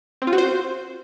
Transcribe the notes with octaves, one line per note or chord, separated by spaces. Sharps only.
C4
F4
F#4
C5